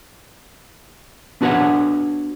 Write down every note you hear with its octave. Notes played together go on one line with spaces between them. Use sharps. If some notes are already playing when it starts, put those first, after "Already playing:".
B3 D4 F#4 B4 C#5 F#5